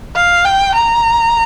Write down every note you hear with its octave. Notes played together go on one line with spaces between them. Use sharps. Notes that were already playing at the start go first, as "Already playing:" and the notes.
F5
G5
A#5